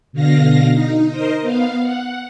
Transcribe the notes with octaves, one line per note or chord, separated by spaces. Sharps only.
B2 D3 F5 A#6
D#4
A#4 C5 D#5
B3 F5
F#5